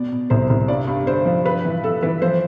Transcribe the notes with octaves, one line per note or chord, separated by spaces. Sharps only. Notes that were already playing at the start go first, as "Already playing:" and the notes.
Already playing: B2 D5
B2
C2 C5
C2
G2 D5
G2
D3 C5
F3
G2 B4
E3
E3 A4
E3 B4
F3 C5